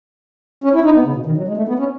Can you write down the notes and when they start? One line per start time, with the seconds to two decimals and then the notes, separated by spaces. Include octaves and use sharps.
0.64 C#4
0.75 E4
0.85 D#4
0.95 B3
1.06 C#3
1.16 B2
1.26 D#3
1.37 F#3
1.48 G#3
1.57 A3
1.68 B3
1.79 C#4